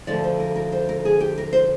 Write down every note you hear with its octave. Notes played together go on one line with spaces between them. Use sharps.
D2 D3 F3 D5
C5
A#4
A#4
C5
A#4
G#4
G4
A#4
C5